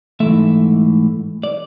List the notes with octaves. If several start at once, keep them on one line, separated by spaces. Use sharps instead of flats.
G#2 E3 A3 E5
D5